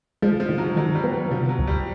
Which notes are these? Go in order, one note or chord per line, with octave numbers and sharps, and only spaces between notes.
F3 G#3
F3
D#3
F#3
D#3 F#3
G3
B3
F#3
C3 F3
F#3
D2
G3